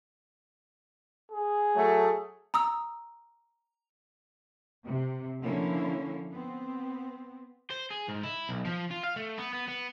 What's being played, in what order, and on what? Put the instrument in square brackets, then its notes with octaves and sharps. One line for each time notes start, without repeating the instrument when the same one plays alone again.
[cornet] G#4
[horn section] F#3 A3
[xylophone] A#5 D#6 E6
[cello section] C3
D3 F3 A#3 C#4 E4
B3 C4
[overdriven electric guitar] C5
G#4
G#2
E4
B1
F3
F4
F5
A3
B3
B3
B3